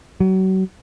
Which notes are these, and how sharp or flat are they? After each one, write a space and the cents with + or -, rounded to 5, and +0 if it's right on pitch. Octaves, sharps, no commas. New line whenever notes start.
F#3 +35